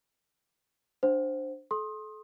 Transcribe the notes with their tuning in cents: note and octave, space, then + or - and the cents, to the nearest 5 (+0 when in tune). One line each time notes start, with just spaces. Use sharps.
D4 +10 C5 +0 F#5 +0
A4 -35 C6 +25 D#6 +0